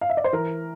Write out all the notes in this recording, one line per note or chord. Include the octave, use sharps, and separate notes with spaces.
F5
E5
D5
C5
E3 A#4